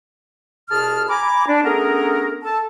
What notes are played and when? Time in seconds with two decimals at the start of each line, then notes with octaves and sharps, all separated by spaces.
0.69 C2 B2 G#4 A5 F6
1.09 G#5 A#5 B5 D6
1.48 D4
1.65 A3 B3 C#4 D4 G#4 A#4
2.44 A4 A5